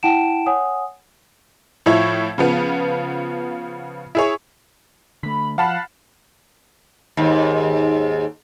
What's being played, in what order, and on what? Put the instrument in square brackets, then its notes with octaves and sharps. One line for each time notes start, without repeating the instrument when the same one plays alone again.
[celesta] E4 F#5 G5 A5 D7 E7
C#5 F#5 G#5 D#6
[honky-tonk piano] A2 F3 E4 C#5 G#6
C#3 F3 B3
E4 G#4 C#5
[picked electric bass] D3 A3 [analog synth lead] B5
[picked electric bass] F3 [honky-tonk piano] F5 A5 B5 [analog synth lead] F#5
[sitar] D#2 G#2